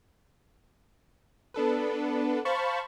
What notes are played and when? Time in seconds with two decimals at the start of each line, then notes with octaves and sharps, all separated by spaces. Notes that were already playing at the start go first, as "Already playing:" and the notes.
1.54 B3 D4 A4 B4
2.45 C5 F5 A5 B5 C#6